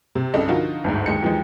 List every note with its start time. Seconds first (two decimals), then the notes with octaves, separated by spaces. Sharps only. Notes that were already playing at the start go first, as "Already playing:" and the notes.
0.15 C3
0.34 C2 G2 C#3 D4 A4 D#5
0.48 D3 F3 D#4 F4 F#4 A#4
0.84 G1 D2 G#2
1.06 D#2 G#3 C#7
1.23 D#2 E3 F3 G#3